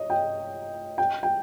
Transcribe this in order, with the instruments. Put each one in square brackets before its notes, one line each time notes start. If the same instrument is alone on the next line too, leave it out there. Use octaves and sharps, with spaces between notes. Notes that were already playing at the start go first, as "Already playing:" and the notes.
Already playing: [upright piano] C#5 D#5
G5
G5
G5